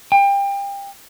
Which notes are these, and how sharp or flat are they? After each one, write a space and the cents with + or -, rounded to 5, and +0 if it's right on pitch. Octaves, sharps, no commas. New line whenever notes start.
G5 +30